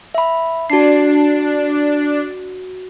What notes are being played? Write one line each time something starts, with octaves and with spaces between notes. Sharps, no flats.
E5 B5
D4 F#4 C7